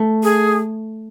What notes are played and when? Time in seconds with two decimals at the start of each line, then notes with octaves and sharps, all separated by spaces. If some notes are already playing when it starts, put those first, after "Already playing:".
Already playing: A3
0.23 G#4